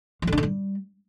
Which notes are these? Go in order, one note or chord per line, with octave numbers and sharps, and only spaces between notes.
F3
D3
D4
D3
G3